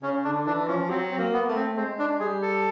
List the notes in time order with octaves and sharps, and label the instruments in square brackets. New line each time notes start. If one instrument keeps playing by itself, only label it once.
[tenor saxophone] C#3 [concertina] C#4
[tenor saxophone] D3 [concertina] D4
[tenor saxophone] E3 [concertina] D4
[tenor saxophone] F3 [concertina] C#4
[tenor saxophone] F#3 [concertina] C4
[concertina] C4
[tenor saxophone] A#3
[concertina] B3
[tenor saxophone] A3
[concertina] C4
[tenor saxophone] G#3 [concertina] C4
[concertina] D4
[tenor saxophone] G3 [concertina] G#4
[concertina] A4